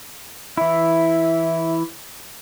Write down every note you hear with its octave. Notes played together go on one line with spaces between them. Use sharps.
E3 E4 E5